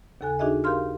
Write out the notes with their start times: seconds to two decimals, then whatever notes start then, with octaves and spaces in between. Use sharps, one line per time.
0.21 D#2 C#3 A4 G#5 F#6
0.39 D4 D#4 F#4 G#4 D#5 E5
0.64 G4 A#4 F5 C6 F6